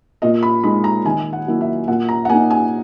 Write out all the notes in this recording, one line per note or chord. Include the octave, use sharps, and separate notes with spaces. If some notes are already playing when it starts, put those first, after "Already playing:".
A#2 D#5
B5
G#3 D#4 B5
A#5
D#3 G#5
F#5
F#3 A#3 E4
E5
A#2 F#5
A#5
F#5
A#3 D#4 G#5
G#5